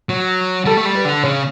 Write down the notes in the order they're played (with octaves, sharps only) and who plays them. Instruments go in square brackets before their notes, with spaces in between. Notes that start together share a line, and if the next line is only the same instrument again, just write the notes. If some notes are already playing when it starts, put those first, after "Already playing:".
[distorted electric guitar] F#3
[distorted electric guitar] G3 [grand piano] A4
[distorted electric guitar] A3
G3
[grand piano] B4
[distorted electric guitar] D3
[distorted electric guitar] C#3 [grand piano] C#5